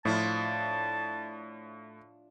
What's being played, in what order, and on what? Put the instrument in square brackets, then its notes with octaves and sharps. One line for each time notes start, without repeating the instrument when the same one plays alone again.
[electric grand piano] A2 [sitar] F3 D4 E4 [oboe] A5